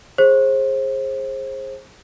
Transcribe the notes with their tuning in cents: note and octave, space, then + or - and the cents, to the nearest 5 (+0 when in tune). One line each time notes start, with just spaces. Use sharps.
G#4 +0 C5 +30